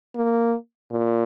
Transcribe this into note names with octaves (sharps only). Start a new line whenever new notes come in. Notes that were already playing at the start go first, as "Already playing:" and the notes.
A#3
A#2